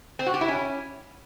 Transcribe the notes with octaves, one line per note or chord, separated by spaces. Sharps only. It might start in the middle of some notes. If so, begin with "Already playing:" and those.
C4
F#4
G4
E4
C#4